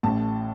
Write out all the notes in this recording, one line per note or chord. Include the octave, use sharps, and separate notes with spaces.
A1 A2 A5